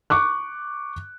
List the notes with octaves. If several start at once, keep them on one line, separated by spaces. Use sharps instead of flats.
C#6 D6 F#6